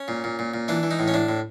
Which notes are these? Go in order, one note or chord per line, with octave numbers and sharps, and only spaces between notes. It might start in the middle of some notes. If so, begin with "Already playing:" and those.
Already playing: C#4
A#2
A#2
A#2
A#2
E3 D4
E3
D#4
A2
C#4
A2 D4
A2